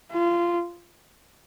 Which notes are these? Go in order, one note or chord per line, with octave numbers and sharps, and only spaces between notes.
F4